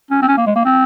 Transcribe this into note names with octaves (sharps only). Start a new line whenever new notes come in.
C#4
C4
C#4
A#3
G#3
A#3
C4